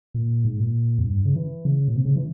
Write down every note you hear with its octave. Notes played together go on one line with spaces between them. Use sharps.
A#2
G#2
A#2
F2
G2
C#3
E3
C#3
A#2
C3
C#3
E3